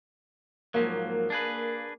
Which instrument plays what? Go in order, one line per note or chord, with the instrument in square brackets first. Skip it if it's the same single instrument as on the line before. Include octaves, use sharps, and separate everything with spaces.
[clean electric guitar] G#2 F3 F#3 [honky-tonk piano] A#3
[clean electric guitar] D4 G#4 B4